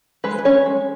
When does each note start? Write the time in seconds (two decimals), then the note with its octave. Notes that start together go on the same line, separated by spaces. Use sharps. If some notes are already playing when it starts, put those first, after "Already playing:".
0.24 G#3 B4
0.38 B4
0.45 C#4 C#5
0.66 G#3